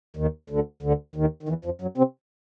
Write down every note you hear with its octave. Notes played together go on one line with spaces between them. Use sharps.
D#2 D#3
D2 D3
D2 D3
D#2 D#3
D#3
E2 E3
F2 F3
F#2 F#3
C3 C4